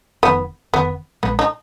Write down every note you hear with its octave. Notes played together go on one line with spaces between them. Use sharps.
F1 F2 D#3 B3
F1 F2 D#3 B3
A#1 A#2 G#3 B3
D#4